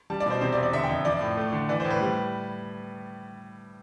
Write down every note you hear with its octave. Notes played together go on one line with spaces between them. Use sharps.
G3 A5
D5
B2 C5
C3 C5
D5
E2
D5
D3 E5
G5
F2
F3 D5
A2
A3
D3
E3 D5
C5
A2
B4
G3